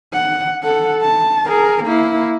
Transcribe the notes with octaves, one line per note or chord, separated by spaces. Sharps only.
F#5
A4 F#5
A5
G#4 A#4
A#3 E4